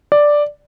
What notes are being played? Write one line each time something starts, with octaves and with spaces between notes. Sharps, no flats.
D5